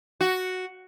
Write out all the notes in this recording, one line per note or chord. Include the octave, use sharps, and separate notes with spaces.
F#4